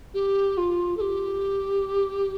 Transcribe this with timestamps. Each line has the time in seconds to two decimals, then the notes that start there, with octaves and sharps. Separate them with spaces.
0.14 G4
0.57 F4
0.97 A4
1.01 G4